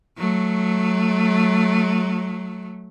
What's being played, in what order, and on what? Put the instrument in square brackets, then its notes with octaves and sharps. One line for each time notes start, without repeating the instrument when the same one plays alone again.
[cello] F#3 A3